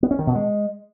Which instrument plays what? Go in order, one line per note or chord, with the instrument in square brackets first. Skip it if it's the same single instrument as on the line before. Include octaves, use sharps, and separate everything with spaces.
[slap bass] B3
C#4
D#3
B2
G#3